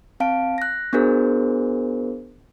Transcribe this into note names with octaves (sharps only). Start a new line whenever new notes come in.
C4 F5 A5 D7
F#6 A#6
B3 D4 F#4 G#4 A#4 C5